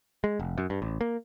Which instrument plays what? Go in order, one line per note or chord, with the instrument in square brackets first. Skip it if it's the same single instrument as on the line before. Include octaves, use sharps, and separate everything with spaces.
[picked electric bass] G#3
F1
F#2
G2
A1
A#3